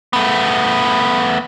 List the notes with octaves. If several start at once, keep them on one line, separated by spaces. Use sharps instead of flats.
A3 B3